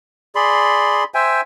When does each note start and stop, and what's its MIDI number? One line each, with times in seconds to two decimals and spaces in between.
0.35 1.04 68
0.35 1.04 74
0.35 1.04 83
0.35 1.04 84
1.14 1.41 72
1.14 1.41 76
1.14 1.41 79
1.14 1.41 80